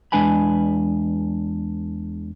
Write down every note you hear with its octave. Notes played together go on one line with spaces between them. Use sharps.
E2 G#3 D4 B4 G#5 B5